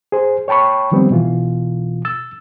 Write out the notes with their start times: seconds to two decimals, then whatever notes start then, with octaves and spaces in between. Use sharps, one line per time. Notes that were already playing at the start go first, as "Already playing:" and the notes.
0.12 G#4 C5
0.48 C#5 G5 A5 B5 C#6
0.92 D#3 F3 G3 B3 C4
1.11 B2 E3 F4
2.05 E6 A6